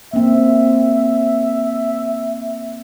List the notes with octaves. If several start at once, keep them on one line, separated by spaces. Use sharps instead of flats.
A#3 C4 E5